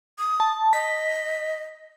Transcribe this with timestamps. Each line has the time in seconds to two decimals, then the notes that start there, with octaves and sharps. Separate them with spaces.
0.19 D#6
0.40 A5
0.73 D#5 B6